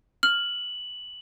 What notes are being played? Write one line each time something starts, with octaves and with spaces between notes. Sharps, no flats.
F6 F#7